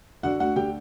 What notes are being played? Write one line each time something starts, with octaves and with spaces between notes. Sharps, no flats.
D3 F#4 F#5
D2 F#4 F#5
D3 G4 G5